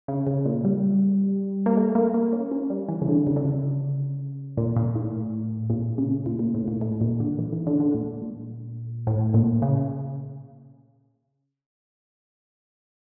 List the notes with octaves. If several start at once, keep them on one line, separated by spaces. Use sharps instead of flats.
C#3
C#3
A#2
G3
A#3
A3
A#3
A#3
C#4
C#4
G3
E3
C#3
D3
C#3
D3
C#3
A#2
A#2
A2
A#2
C#3
A#2
A#2
A2
A#2
A2
A#2
D3
E3
E3
D3
D3
A#2
A#2
A2
A#2
C#3